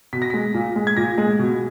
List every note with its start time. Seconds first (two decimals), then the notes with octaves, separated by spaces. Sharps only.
0.13 B2 B6
0.22 A#6
0.30 G#3 B6
0.54 A#2
0.76 G#3
0.87 G#6
0.97 A#2 A#6
1.18 G#3
1.39 B2